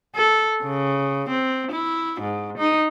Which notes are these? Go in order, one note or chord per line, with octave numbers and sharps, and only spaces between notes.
A4
C#3
C4
E4
G#2
D#4